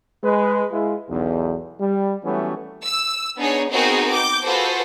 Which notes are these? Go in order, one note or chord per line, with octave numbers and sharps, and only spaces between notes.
G#3 B4
G#3 E4 F4
B1 E2
G3
E3 F#3 G3 A3 B3 C#4
E6
B3 D4 D#4 G#4 C#5
B3 C4 D#4 F#4 G#4 A#4
D6 G6
F4 F#4 G#4 A4 B4 C5